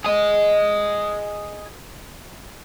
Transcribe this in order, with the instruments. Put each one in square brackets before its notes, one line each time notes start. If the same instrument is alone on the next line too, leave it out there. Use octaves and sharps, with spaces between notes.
[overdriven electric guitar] G#4 D#5